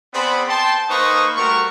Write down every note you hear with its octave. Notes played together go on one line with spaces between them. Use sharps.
B3 C4 G#4 C5 D5 B5
G5 A5 C6
A#3 D#4 B4 C5 C#6 D#6
G3 A3 F#4 A#4 C#6